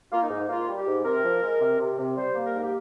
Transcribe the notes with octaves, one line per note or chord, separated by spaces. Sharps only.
A#3 F4
D#4
G#2
A#3 F4
G3
G4
G#2
C3 A#4
F3
G#3
C3
C3
C3
G3 C5
A#3
A#4
G#2
G4